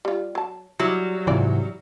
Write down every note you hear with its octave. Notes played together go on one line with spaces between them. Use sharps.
G3 F4
F#3 A5
F#3 G3 E4
G#2 C3 E3 F4 D5